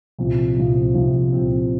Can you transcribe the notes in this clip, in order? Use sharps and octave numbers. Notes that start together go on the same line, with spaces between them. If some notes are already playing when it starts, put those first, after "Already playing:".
C2 A#2 F3 C4
C2 A#2 F3 C4
C2 A#2 F3 C4
C2 A#2 F3 C4